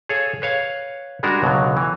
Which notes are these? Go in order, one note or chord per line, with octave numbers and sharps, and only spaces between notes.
G#4 A4 C#5 F5
B4 C#5 F5
G3 G#3 D4 F#4 A#4
C#2 B2 D3 F#3
E3